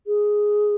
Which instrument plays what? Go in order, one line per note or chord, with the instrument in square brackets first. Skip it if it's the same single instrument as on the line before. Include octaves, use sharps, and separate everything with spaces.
[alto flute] G#4